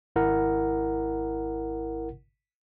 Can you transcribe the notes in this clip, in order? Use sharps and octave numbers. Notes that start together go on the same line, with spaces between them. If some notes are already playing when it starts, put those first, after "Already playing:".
G#1 E4 A#4 F#5